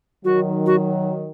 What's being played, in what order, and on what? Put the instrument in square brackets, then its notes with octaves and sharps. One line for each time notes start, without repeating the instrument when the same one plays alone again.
[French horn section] D#3 F#3 [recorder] F#4
[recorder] F#4